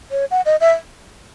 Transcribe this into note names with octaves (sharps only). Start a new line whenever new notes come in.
C#5
F#5
D#5
E5